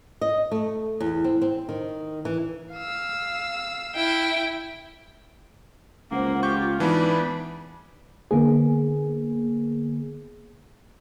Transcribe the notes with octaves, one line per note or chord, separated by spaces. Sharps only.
D#5
A3
E2
C4
C4
D#3
E3
F5 E6
E4 G5
C#2 A#3 C5 F#5
F4 G4 C#6 G6
G#2 E3 B3 D4 B5
D3 A#3 B3 G#4